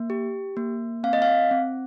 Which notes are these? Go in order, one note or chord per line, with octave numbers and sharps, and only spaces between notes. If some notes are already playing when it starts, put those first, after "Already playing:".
Already playing: A#3
G4
A#3
C4 F5
D#5
F5
C4